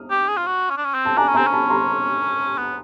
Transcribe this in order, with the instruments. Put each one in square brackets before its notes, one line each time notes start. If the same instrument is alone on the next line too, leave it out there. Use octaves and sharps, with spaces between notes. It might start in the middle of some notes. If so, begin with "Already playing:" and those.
Already playing: [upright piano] D#6 F6
[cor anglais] G4
G#4
F4
F#4
C#4
D4
C#4
C4
[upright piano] A5
[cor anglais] D4 [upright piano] G#5 A#5
[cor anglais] C#4
[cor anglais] C4 [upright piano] G#5 A#5
[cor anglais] C#4
[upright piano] A5 B5
A#5 C6
[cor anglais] B3